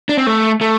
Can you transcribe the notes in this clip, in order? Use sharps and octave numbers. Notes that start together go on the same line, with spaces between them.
D4
C4
A3
A3